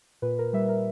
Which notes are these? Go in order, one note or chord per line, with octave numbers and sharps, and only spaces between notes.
A#2 B4
A#4
G3 E5
A#4